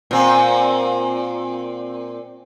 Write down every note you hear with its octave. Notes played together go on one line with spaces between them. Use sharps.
A#2 C4